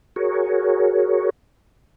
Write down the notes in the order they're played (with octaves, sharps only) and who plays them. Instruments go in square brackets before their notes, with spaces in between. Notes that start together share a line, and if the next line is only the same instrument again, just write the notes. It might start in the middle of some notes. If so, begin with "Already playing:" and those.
[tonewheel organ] F#4 G#4 A#4 C#5